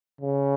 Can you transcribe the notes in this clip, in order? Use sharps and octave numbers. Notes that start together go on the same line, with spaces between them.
C#3